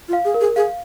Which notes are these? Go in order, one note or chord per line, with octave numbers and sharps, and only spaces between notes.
F4
F5
G#4
A#4
G#4
G#4 F5